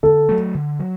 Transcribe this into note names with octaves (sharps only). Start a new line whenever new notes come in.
D3 A4
F#3 A3
D3
F#3